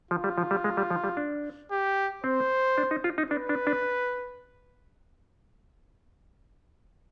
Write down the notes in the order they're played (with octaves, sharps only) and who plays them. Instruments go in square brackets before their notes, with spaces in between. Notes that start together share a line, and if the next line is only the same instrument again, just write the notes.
[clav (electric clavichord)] F3 [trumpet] F4
[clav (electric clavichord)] G3
F3
G3
G#3
G3
F3
G3
D4
[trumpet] G4
[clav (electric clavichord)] C4 [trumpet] C5
[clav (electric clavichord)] D4
D#4
F4
D#4
[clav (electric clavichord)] D4 [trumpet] B4
[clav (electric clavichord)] D4
D4